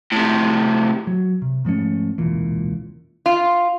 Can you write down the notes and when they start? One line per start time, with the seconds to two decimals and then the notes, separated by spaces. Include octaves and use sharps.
0.12 A2 C3
1.07 F#3
1.42 C3
1.65 G#2 F3 A3 C#4
2.18 E1 C#2 A#2 E3
3.26 F4